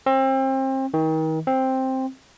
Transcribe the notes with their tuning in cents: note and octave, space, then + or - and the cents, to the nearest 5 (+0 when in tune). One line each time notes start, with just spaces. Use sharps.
C4 +30
D#3 +35
C4 +5